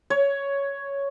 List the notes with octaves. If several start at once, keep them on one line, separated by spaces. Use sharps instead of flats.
C#5